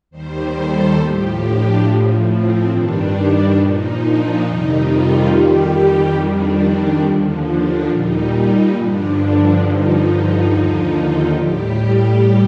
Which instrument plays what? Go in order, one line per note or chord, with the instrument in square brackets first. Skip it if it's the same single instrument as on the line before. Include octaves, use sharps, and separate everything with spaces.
[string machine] D#2 D#3 G3 C5
A4
A2 F3 G4
D4
A2 F3
C4
G2 D#3 G3 D4
A#2 F3 D#4
D4
F2 C3 D#3 G3 D#4
F4
F2 D#3 G3 G4
F2 D#3 G3 D4
D#2 D3 F3
D4
A#2 G3 D#4
D#4
G2 D3 F3 D4
G2 D3 F3 D#4
D#4
D#2 D3 F3 D#4
A2 G3 G4